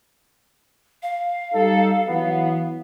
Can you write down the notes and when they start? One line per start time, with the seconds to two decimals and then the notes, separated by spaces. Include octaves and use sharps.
1.02 F5
1.54 G3 D#4 A4
2.08 E3 F#3 B3